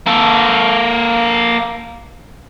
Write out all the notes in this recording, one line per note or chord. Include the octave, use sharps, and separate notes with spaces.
A#3 A4